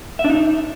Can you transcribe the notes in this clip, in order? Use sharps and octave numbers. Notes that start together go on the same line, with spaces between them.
E5
D4
D#4